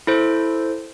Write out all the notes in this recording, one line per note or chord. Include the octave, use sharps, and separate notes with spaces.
E4 A4 C5